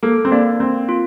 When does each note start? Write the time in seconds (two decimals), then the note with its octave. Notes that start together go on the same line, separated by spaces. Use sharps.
0.03 A#3 A4
0.25 C4
0.31 A#3 D4
0.60 A#3 C4
0.89 F4